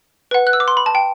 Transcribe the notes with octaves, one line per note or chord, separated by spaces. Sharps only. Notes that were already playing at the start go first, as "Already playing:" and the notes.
B4 F#5
F#6
E6
D6
C6
B5
A5
G5